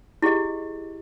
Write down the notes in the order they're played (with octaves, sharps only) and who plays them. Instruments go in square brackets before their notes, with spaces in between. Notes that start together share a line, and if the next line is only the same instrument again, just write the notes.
[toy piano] E4 G4 G#4 D#5